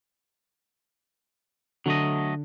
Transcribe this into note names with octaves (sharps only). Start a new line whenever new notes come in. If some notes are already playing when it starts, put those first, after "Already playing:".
D3 F#3 A3 D#5